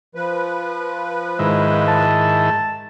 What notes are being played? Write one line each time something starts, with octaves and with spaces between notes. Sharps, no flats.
F3 B4
G#2 D#3 G#3 E4
A5